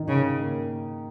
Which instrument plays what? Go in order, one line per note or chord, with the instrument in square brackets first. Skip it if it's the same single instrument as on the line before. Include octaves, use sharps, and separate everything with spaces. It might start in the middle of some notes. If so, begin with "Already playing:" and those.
Already playing: [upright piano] D#3 D#4
[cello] C#3
[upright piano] A#3